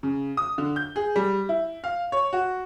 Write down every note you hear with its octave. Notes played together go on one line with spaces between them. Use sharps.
C#3
D#6
D3
G6
G#4
G3
E4
F5
C#5
F#4